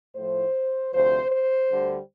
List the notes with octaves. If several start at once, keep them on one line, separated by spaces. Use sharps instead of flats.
A2 F3 C5
D2 C3 F3 C5
C5
D2 D3 G3